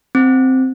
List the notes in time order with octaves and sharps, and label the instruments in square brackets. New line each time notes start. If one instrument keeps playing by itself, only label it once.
[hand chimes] C4